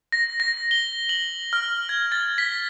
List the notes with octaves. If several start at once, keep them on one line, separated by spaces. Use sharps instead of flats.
A#6
A#6
G7
F#7
F6
G#6
A6
B6